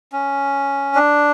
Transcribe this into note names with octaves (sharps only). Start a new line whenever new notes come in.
C#4
D4